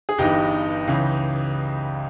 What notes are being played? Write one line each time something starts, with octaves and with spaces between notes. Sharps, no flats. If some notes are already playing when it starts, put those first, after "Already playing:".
G#4
G1 G2 E3 D#4 G4
C#2 C#3 E3